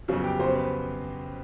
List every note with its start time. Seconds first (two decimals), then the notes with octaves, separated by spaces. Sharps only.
0.08 F2 C#3 F#3 B3 F#4
0.24 G4
0.39 F2 C#3 F#3 B3 C5
0.55 B4